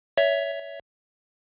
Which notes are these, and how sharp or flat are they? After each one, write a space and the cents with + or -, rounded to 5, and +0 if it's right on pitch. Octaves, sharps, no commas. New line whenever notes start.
C#5 +20 E5 +0